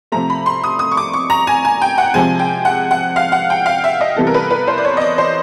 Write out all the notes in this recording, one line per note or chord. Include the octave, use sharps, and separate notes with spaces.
C3 F3 A3 A#5
B5
C6
D#6
D#6
C#6
D6
C#6
A#5
G#5
G#5
G5
F#5
C3 F3 G#3 G#5
G5
F#5
F#5
F5
F#5
G5
F5
E5
D#5
C3 E3 G3 B3 A4
A#4
B4
B4
C5
D5
C#5
D#5
D5
C5